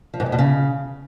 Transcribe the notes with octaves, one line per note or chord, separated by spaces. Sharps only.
F3
G#2
F2
B2
C#3